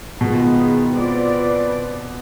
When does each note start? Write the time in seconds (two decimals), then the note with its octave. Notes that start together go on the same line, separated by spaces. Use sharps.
0.20 B2 D#3 G#3 B3 F4
0.96 C4 F4 B4 D5